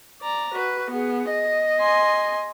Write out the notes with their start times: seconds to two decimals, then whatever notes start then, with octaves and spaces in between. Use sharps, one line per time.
0.22 D5 A#5
0.53 F#4 B4
0.91 B3 G#4
1.31 D#5
1.80 G#5 C6